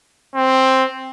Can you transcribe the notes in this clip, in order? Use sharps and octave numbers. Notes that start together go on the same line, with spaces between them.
C4